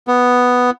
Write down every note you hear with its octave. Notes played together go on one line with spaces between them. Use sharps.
B3